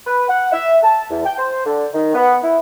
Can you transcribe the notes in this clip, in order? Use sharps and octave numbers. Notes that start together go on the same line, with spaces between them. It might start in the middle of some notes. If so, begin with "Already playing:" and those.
B4
F#5
E5
A5
E2
G5
C5
D3
D#3
B3
E4